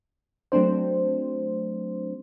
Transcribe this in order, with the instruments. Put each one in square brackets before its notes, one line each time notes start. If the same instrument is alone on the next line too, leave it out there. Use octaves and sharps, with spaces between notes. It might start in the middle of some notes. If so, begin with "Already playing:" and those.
[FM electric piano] F#3 A3 C4 D4 C5